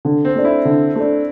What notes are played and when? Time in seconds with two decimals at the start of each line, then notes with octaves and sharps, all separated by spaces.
0.05 D3
0.25 C4
0.36 A3 D4
0.45 E4
0.65 D3
0.96 A3 D4